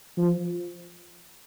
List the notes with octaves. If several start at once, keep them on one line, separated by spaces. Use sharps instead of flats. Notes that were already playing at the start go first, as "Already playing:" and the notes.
F3